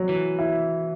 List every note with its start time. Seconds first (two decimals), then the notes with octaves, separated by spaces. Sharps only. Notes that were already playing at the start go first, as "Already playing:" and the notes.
Already playing: F#3
0.09 E3
0.39 E4